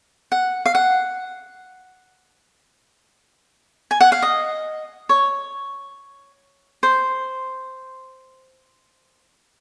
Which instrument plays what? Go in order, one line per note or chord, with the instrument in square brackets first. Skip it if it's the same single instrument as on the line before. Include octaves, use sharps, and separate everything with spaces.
[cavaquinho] F#5
F5
F#5
G#5
F#5
F5
D#5
C#5
C5